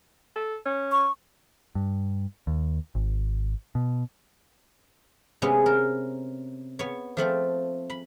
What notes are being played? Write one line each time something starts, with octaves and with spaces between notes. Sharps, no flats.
A4
C#4
C#6
G2
D#2
G#1
B2
C3 G#3 B3 C#4
A#4
B3 C#5
F3 A3 C4 C5
B5